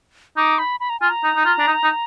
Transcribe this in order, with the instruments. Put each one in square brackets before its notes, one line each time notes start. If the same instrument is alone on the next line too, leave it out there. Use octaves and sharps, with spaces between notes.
[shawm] D#4 [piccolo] D6
[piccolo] B5
B5
A#5
[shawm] F4 [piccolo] G#5
[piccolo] A#5
[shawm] D#4
D#4
F4
D4
D#4
D#4